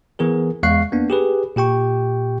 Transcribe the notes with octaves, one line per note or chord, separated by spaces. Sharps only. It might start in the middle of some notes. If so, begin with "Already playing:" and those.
E3 B3 G#4 A#4
E2 G#3 F5 C#6 F#6 C7
A#3 B3 D4
G4 G#4 B4
A#2 G4 G5 C#6